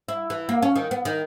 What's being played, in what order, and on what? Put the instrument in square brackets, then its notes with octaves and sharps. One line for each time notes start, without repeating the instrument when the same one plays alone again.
[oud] E4
E3
A#3
C#4
D#3
B3
D#3